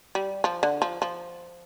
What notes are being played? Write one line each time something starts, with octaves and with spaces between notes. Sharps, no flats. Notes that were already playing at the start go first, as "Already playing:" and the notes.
G3
F3
D3
F3
F3